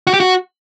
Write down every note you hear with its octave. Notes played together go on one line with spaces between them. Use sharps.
F#4
G4
F#4